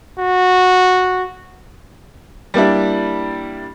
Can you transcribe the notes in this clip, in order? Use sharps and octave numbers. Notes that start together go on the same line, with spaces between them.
F#4
G3 A#3 D4 E4